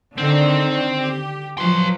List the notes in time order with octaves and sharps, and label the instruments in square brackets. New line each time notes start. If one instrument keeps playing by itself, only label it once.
[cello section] D3 D#3 [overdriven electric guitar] C4
[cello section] G4
[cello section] F3 F#3 [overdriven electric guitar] B4 C6